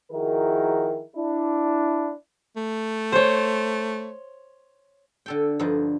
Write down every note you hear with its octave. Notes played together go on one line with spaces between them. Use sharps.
D#3 F3 E4 F#4 G#4 A#4
D4 E4
A3
C5 C#5
D3 A4 G5
G2 D3 F3 D#4